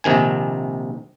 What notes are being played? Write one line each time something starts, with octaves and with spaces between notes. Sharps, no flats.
A#1 C3 D#3 G#5